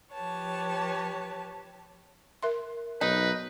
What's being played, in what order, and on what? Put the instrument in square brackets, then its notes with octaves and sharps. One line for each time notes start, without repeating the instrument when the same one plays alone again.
[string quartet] F3 G4 B4 C#5 A5
[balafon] A#4 E5 C6
[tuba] B1 [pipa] D#4 [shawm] B4